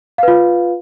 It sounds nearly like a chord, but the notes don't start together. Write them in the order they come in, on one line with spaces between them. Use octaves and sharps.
F5 B4 F4